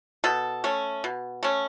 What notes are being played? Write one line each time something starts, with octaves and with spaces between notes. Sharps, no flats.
B2 A4
A3 C#4
B2
A3 C#4